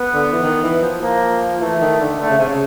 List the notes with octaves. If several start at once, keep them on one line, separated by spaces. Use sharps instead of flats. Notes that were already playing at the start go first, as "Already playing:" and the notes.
Already playing: B3
D3
E3
D#3
E3
F3
F3 A#3
E3 A3
E3
D#3
D3
D3 A3
C#3
C3
C#3